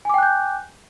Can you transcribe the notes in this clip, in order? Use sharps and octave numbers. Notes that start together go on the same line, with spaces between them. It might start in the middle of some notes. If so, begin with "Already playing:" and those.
G5 G#5 D6 F#6 G6